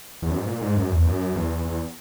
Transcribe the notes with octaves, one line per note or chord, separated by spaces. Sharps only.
E2
F#2
G#2
A#2
G#2
F#2
E2
F#2
E2
E2